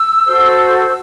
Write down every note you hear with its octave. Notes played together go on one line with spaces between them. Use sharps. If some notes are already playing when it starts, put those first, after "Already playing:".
Already playing: E6
F#4 A4 C5